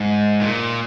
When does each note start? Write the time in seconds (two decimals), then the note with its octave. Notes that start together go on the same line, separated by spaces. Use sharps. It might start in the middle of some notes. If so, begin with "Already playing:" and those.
Already playing: G#2
0.41 A#2